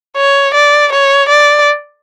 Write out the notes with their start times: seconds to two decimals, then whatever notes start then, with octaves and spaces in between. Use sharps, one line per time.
0.17 C#5
0.54 D5
0.92 C#5
1.29 D5